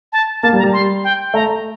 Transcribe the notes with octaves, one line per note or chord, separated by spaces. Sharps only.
A5
A#3 A5
G3
A#5
G3
C6
G5
A3 A#5